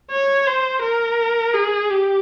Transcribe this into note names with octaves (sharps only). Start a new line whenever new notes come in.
C#5
C5
A#4
G#4
G4